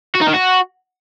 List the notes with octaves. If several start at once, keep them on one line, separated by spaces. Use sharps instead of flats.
F#4
D#4
D#3
F#4